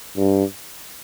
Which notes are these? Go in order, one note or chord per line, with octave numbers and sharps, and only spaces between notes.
G2